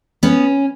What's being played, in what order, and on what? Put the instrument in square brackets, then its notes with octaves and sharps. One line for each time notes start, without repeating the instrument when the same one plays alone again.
[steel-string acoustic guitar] B3 C#4